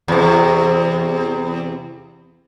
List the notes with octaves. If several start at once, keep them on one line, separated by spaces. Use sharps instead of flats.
E2 C3